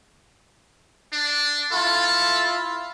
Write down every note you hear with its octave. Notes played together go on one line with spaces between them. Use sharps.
D4
E4 F4 A4